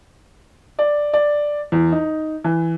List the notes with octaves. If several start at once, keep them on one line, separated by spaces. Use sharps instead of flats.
D5
D5
E2
D#4
E3